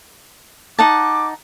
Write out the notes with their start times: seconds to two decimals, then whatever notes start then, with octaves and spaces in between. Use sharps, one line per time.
0.79 D#4 F#5 A5 D6